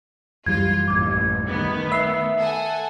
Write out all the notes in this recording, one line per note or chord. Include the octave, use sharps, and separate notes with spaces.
F#2 E3 G3 F4 G#6
A1 D#2 D6 G#6
D#3 A3 B3
E5 E6 C7
A4 F#5 G#5